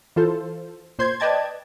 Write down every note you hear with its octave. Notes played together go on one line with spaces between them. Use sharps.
E3 F4 A4 C5
A#2 C5 C6 G6 G#6
B4 D5 D#5 G5 A5 G#6